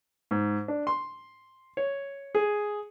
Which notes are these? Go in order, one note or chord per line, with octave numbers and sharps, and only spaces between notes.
G#2
D4
C6
C#5
G#4